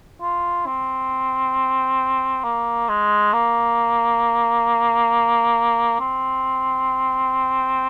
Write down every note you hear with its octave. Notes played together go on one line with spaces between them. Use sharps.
F4
C4
A#3
G#3
A#3
C4